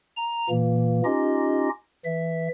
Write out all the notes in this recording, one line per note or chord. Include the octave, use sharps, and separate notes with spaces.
A#5
A#2 E3 A#3
C#4 D#4 F4 G4 D#5
E3 E5